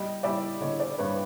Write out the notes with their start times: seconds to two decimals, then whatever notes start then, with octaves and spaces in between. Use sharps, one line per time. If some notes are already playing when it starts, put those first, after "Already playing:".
Already playing: G3 D#5
0.23 G3 D5 E5
0.61 D3 C#5 D#5
0.80 C5 D5
0.98 G2 B4 C#5